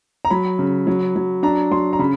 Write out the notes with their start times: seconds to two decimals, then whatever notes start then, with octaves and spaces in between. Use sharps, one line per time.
0.25 A#5
0.30 F#3 B5
0.59 C#3
0.87 F#3
1.16 F#3
1.43 D4 A#5
1.71 F#3 C6
1.93 A#5
1.99 C#3 B5